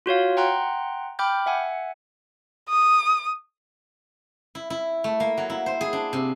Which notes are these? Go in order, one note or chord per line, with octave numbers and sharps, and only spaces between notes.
F4 F#4 C#5 F5
F#5 G5 A#5 C6 F#6
G5 B5 D6 F6 G6
E5 F#5 G#5
D#6
E4
E4
A3
A#3
F#3
E4
C5
G#4
D4
C3